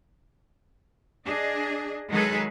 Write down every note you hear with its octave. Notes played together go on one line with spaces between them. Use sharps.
D4 G#4 D#5
D#3 F#3 G#3 G#4 A4 B4